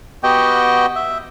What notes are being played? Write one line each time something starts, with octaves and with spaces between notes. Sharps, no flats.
B3 F#4 G4 D#5 G5
E5